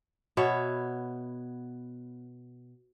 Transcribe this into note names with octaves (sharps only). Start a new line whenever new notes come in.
B2 B3 C#5 E5